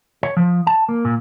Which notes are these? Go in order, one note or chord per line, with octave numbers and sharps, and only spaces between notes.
C#5
F3
A5
A#3
A#2